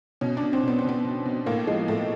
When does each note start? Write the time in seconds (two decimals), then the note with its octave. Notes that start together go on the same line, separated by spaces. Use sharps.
0.21 B2 C#4
0.37 D4
0.42 B2
0.53 C4
0.63 B2
0.68 B3
0.79 C4
0.84 B2 B3
1.04 B2
1.25 B2
1.46 A2 A#3
1.67 F3 G#3
1.88 A2 A3